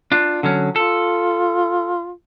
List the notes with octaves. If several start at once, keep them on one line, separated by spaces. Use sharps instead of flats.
D4 F4
D3 F#3 C#4
F4 A4